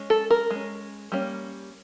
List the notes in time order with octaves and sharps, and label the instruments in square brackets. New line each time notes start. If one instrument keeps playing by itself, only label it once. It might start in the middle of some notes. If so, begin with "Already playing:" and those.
Already playing: [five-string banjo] G#3 C#4
A4
A#4
G#3 C#4
G3 A#3 C#4